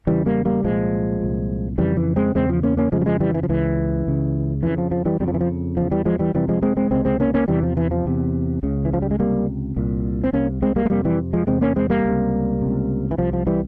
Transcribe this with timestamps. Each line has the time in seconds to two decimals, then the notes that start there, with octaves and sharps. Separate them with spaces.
0.07 E2 C#3 E3 G3
0.26 G3 A#3
0.45 G3 A#3
0.64 C2 A#2 F3 G#3
1.22 C2 A#2
1.78 F2 C#3 E3 G3
1.97 E3
2.16 G#3 C4
2.35 E2 C#3 G#3 C4
2.49 F3
2.63 A#3 C#4
2.77 A#3 C#4
2.92 F2 C#3 F3 G#3
3.01 G3
3.06 F3 G#3
3.20 E3 G3
3.34 E3
3.43 F3
3.49 C#2 C#3 E3
4.07 C#2 C#3
4.62 F2 C#3 E3
4.78 F3
4.91 F3
5.05 E3 G3
5.20 F2 C#3 G3
5.28 F3
5.34 E3
5.41 F3
5.77 E2 C#3 F3
5.91 E3 G3
6.05 F3 G#3
6.19 E3 G3
6.34 F2 C3 E3 G3
6.49 F3 G#3
6.62 G#3 C4
6.77 G#3 C4
6.91 C#2 C3 G#3 C4
7.05 G#3 C4
7.20 A#3 C#4
7.34 A#3 C#4
7.48 E2 C3 E3 G3
7.63 F3
7.77 E3
7.91 F3
8.06 E2 C3
8.63 C#2 C#3
8.85 E3
8.93 F3
9.02 G3
9.11 G#3
9.19 C#2 C3 G3 A#3
9.76 C2 A#2
10.24 C4
10.33 C2 C3 A#3 C#4
10.62 G#3 C4
10.76 G3 A#3
10.85 G#3
10.90 F2 C3 G3 A#3
11.05 E3 G3
11.33 F3 G#3
11.47 E2 C3 G#3 C4
11.61 A#3 C#4
11.76 G#3 C4
11.90 G3 A#3
12.04 C#2 C3
12.61 C#2 C3
13.11 E3
13.18 C2 C3 F3
13.33 F3
13.47 E3 G3